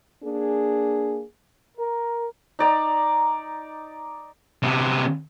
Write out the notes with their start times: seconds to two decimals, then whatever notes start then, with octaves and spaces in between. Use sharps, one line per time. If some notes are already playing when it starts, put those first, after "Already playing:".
0.24 A#3 D4 G#4
1.78 A#4
2.59 D#4 D5 A#5
4.63 C3 B3